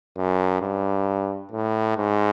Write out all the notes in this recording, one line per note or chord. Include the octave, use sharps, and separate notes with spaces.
F#2
G2
A2
G#2